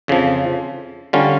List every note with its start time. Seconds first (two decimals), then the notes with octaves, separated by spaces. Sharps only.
0.08 F2 C#3 F3
1.13 D3 G3 C#4 F4